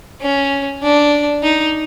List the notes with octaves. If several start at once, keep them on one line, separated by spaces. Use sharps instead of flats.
C#4
D4
D#4